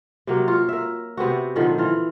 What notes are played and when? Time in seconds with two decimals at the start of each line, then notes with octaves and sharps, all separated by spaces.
0.27 C3 F#3 A#3
0.48 F4 C#5
0.69 A#4 E5
1.17 C3 B3 C4 F#4
1.56 A#2 D3 D#3 F3
1.78 E3 F4